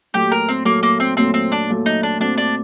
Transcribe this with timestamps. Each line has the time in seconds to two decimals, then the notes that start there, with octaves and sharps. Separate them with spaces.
0.14 A#2 F#3 A3 G4
0.32 A#4
0.48 C4
0.65 A#2 F#3 A3 A#3
0.83 A#3
1.00 C4
1.17 A#2 F#3 A3 C4
1.34 C4
1.52 D4
1.69 A#2 F#3 A3
1.86 D#4
2.03 D4
2.20 A#2 A3 C4 D4 F#4
2.38 D4